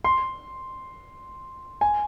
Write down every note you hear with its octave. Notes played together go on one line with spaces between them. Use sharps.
C6
G#5